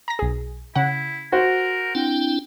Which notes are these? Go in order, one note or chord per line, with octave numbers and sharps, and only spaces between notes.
A#5 A#6
B1 G#4
C#3 E4 F#5
F#4 A#4 C5
C4 D4 E4 G5